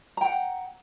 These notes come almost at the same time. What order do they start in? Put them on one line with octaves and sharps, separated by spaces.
A#5 G5 F#5